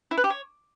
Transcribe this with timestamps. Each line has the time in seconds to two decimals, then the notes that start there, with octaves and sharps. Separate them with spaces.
0.11 E4
0.17 B4
0.24 G4
0.30 C#5